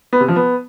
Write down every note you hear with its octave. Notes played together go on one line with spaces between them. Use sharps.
B3
C3
F3
B3